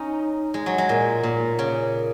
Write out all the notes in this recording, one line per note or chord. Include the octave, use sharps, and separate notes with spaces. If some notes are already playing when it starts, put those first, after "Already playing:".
Already playing: C#4 D#4
G#3
F#3
G#3
A#2
A#2
C#3